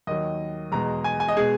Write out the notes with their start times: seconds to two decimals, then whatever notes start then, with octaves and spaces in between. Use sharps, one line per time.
0.07 D#2 D#3 F#3 D#5
0.72 E2 B2 G#3 A#5
1.04 G#5
1.20 G#5
1.28 D#5
1.36 B2 G#3 G#4